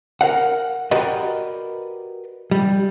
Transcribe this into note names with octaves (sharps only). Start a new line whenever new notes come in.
A#4 F5 F#5
F#4 G4 A#4 B4 D5 D#5
G3